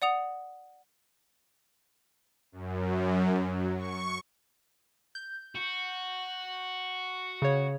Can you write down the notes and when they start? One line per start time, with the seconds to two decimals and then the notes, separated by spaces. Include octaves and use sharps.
0.02 D5 F#5 D#6 F7
2.52 F#2
3.48 F#3
3.77 C#6
5.15 G6
5.55 F#4
7.42 C#3 C#5